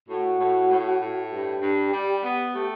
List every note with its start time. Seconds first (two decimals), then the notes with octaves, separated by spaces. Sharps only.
0.08 A2 F#4
0.39 A2
0.70 A2
1.00 A2
1.30 G2 G4
1.61 G2
1.92 G3
2.23 B3
2.53 A3 G4